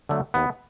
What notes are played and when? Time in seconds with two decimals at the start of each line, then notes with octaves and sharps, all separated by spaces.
0.09 D3 F#3 A3
0.34 D#2 B3